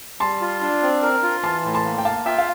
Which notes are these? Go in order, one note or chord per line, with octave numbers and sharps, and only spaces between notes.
G3 A5 C6
F4
D4
C4
A#4
F4
E3 A5 C6
A2
A5 C6
A#3
G5
A#3 F5 A5
F4 E5 G5
F5